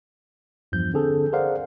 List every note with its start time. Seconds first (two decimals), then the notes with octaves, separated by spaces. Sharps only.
0.72 E2 G2 F3 G6
0.94 D3 C4 G#4 A4
1.33 G#4 A#4 C5 D5 F5 F#5